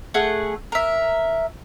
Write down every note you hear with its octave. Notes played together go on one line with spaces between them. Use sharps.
A3 G#4 F#5
A#4 E5